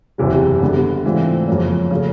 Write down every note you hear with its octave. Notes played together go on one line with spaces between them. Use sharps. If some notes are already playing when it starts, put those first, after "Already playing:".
F#1 E2 C3 E3 G3
D3 G3 B3
G#2 E3 A3 C4 F4
F2 C#3 F#3 A#3 C#4
C#3 F#3 A3